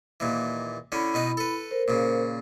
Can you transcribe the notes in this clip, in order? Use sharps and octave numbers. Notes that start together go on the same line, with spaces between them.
D#2 A#2 E3
D3 C#4 E4 B5
B2 D#4 B4
A4 B4
A#4 C5
A#2 C#3